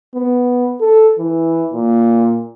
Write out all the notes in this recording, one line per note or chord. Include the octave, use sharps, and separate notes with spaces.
B3
A4
E3
A#2